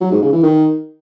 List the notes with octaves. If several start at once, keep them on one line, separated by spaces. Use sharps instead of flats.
F#3
G#2
C#3
E3
D#3